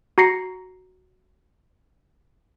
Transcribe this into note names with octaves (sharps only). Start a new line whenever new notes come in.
F#4 A#5 A#6 C7 C#7